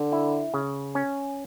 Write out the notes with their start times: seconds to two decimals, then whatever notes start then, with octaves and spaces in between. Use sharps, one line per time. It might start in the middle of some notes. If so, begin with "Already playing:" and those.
Already playing: D3
0.12 E4
0.54 C#3
0.95 C#4